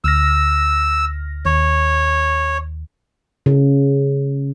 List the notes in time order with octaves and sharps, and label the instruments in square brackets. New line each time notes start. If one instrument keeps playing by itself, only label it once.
[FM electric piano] D2 F6 A#6 [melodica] E6
[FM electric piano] D#2 [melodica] C#5
[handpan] C#3